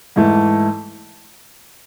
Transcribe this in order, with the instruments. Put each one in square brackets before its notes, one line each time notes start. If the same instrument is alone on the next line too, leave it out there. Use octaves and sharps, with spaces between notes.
[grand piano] G#2 E3 A3